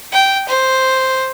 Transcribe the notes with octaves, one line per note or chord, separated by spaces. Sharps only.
G5
C5